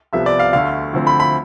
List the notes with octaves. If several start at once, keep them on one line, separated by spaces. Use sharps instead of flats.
C2 C3 F3 B3 E5
D5
F5
D2 D3 A3 F5
D2 D3 F3 C4
B5
B5